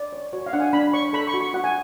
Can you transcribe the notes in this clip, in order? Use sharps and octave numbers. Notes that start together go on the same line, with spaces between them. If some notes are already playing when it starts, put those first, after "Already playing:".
Already playing: D5
C#5
F#4 C#5
F5
D4 F#5
G#5
D4 B5
C#5 C#6
A4 B5
C#6
F#4
C#6
F#4 F#5
G#5